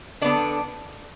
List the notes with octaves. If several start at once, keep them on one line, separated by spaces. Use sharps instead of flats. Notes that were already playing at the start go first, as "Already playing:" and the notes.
D3 B3 D4 D5